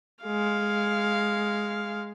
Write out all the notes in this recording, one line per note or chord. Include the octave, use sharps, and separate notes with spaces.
G#3 F5